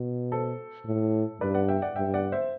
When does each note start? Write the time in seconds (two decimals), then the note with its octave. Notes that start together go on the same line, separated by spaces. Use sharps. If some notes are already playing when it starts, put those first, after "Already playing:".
Already playing: B2
0.32 A4 C5
0.86 A2
1.41 G2 B4 D5
1.54 D5 F#5
1.68 E5 G5
1.82 D5 F#5
1.96 G2 E5 G5
2.14 D5 F#5
2.32 C5 E5